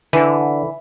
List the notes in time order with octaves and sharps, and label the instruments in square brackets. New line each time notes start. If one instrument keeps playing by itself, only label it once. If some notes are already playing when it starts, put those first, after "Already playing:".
[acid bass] D3 [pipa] E3